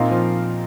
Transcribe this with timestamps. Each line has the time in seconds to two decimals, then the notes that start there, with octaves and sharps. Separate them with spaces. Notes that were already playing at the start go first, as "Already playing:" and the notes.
Already playing: A#2 C4 D#4 A#4 F5
0.11 F3